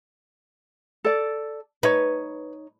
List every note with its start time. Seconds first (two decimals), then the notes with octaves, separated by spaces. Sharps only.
1.04 A4 D5
1.83 D#4 B4 C#5